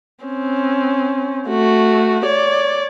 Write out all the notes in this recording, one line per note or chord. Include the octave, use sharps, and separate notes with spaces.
C4 C#4
A3 F#4
C#5 D5